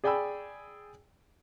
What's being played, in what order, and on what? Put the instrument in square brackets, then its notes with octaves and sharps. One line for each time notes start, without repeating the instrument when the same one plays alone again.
[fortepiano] G#4 D5 G5 G#5 B5 E6